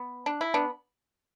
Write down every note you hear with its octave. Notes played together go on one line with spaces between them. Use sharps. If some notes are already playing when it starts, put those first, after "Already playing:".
Already playing: B3
D4
E4
B3 D4